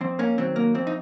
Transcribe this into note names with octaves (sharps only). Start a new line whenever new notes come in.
F2 C4
A#3 C#4
D#3 F#3 C4
A#3
F2 C4
D#4